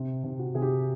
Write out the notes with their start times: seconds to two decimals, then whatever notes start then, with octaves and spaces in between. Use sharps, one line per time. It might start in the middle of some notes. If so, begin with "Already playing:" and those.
Already playing: C3
0.24 C3
0.39 F#4
0.55 C3 G#4
0.62 G4